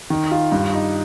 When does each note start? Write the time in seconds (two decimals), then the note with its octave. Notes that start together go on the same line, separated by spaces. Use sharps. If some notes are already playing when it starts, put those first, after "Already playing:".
0.10 D#3
0.31 F4
0.52 G2
0.73 D#4